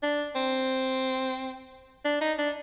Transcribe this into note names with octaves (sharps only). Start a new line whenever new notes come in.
D4
C4
D4
D#4
D4